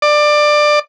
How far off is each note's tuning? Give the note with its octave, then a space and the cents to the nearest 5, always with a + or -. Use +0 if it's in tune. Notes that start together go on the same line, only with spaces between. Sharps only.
D5 +20